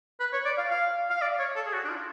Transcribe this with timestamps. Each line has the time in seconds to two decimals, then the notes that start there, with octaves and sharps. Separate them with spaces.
0.20 B4
0.33 C#5
0.45 D5
0.57 F5
0.70 F5
1.10 F5
1.21 D5
1.39 C#5
1.56 A4
1.66 G#4
1.73 F#4
1.84 D4
1.89 F4